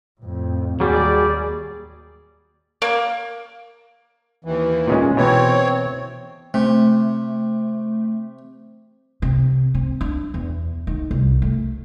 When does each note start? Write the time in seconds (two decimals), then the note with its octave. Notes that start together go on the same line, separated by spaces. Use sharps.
0.21 F2 A2
0.80 D#2 F#3 G3 G#4 D5
2.82 A#3
4.45 D#2 E3
4.87 A#2 C#3 G#3
5.17 B2 E3 C4 C#5
6.54 C3 A3
9.22 C3
9.75 C4
10.01 D4
10.34 E2
10.87 D#3
11.11 C2
11.42 A3